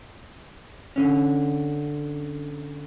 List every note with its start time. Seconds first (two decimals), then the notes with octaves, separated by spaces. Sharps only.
0.96 D3 C#4